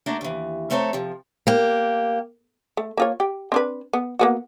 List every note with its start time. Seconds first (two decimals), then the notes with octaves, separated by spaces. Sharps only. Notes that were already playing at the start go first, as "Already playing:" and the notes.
0.06 A3 A#3 D4 F#4
0.21 D#2 E3
0.70 F2 A3 C4 A4 C#5 A#5
0.93 C3 F3
1.47 A#3 G4
2.77 A3
2.97 A#3 F4 C#5
3.20 G4
3.52 C4 D4 B4
3.93 B3
4.19 A#3 B3 F#4